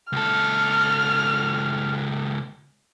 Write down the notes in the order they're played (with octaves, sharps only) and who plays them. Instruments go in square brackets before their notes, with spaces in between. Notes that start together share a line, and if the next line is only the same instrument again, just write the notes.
[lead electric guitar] C#2 A4 [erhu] F6